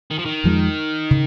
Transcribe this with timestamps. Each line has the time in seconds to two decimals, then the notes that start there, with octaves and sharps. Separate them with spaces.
0.11 D#3
0.19 F3
0.26 D#3
0.44 F2 F3 G#3
1.11 C#3